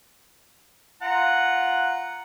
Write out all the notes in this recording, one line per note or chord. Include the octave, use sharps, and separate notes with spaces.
F4 F#5 A#5